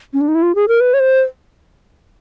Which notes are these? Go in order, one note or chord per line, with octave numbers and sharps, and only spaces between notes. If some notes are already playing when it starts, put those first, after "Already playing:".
C#4
D4
D#4
E4
F4
G#4
A#4
B4
C#5
C5